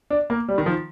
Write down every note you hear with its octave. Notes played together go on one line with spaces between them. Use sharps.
D4
A#3
G3
D#3
F3